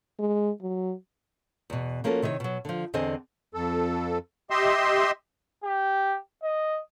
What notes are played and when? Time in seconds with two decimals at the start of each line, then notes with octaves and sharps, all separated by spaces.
0.19 G#3
0.61 F#3
1.70 E2 B2
2.04 F3 A#3 C#4 F#4 A4
2.22 C3 D#3 E4 A#4 C#5
2.40 B2 F#3
2.65 D3 F3
2.94 E2 D3 C4 C5 D#5 G#5
3.54 F2 A4
4.50 G4 D#5 E5 C6
5.64 G4
6.43 D#5